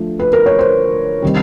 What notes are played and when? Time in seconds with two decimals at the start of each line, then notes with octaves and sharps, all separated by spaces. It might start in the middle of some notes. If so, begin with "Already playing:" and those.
Already playing: D3 F3 A3
0.19 B4
0.33 A#4
0.46 C#5
0.59 C5
1.22 C3 D#3 G3